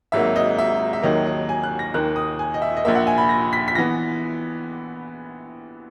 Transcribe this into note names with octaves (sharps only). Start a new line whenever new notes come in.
G#1 G#2 F#3 A#3 E5
D#5
E5
E5
D#2 D#3 F#3 A#3 D#5
D#5
G#5
F#6
A#6
D#2 D#3 A#3 F#6
D#6
G#5
D#5
E5
D#5
A#1 A#2 A#3 E5
F#5
G#5
B5
A#6
B6
B6
E3 B3 A#6